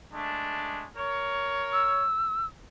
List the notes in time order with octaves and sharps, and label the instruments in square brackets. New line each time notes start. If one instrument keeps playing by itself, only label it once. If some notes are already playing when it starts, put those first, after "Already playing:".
[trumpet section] G#3 A3 D4
A#4 C#5
[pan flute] E6